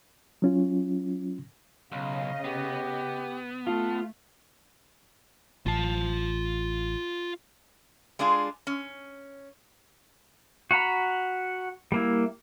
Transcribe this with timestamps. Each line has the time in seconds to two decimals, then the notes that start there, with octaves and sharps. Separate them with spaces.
0.42 F#3 C#4 F4
1.92 B1 C#3 D#5 F5
2.44 B3 G4
3.67 A3 F4 A5
5.66 A1 F4 A5
8.19 G#3 D4 F4 G#4
8.67 C#4
10.71 F#4 F#5 A#5 B5
11.92 G3 A#3 E4